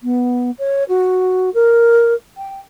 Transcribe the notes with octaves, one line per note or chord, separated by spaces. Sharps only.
B3
C#5
F#4
A#4
G5